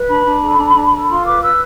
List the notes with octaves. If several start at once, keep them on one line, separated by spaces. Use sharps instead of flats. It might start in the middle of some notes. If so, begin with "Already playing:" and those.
Already playing: B4
D4 B5
D4
A4
D4
D4
A4
F4 C6
B4 D6
B4 E6